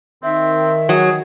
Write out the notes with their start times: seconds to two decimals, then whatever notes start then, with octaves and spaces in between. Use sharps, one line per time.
0.23 D#3 C4 E5
0.89 F#3 G#4